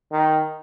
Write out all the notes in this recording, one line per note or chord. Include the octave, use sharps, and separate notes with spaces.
D#3